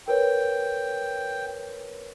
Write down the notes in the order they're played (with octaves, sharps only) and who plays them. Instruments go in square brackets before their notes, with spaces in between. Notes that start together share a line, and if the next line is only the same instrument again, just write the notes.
[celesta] A#4 B4 C#5 [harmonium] G5